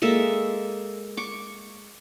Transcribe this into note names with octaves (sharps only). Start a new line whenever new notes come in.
G#3 A#3 A4 E5
C#6 D6